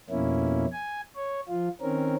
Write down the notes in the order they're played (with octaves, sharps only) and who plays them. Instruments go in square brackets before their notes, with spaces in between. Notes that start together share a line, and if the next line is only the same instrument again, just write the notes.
[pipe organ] F2 B2 A#3 C#4 E4
G#5
C#5
F3 F4
D#3 C4 C#4 A#4